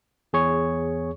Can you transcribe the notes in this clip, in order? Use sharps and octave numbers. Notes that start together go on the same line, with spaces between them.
E2 G#4 C#5 C#6